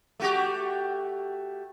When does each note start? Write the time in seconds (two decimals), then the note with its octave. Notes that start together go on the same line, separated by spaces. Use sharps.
0.20 A3 F#4 G4